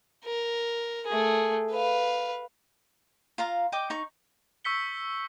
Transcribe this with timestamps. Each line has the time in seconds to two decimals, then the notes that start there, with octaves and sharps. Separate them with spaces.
0.25 A#4
1.07 A3 G#4
1.72 B4 F5
3.38 F4 F5 A#5
3.72 D#5 G5 D6
3.90 D#4 C#6
4.64 C#6 E6 G6 B6 C#7 G7